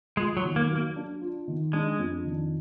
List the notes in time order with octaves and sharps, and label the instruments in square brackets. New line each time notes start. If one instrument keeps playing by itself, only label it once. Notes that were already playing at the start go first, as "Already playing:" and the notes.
[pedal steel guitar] G#3 [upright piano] F4
[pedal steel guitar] F#3
[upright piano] D#3
[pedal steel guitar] A#3
[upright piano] F#3
[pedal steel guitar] A#3
[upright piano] D4
F4
D#3
[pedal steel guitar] G#3 [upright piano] D4
[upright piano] F2
D#3